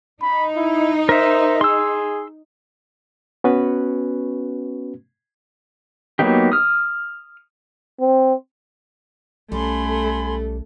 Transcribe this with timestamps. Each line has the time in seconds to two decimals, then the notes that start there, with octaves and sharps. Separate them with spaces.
0.22 D#4 B5
0.57 E4
1.09 A#4 C5 E5
1.61 G#4 C6 E6
3.44 B3 C#4 F#4 B4
6.19 F#3 A#3 B3 D#4 G4
6.52 D#6 F6
8.00 C4
9.52 B1 G3 A3 C#4 A4 G#5 B5 C6